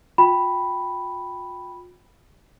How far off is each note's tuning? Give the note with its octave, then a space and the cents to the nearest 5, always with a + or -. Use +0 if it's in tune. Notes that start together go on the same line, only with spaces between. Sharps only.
F4 +45 G5 +0 B5 +0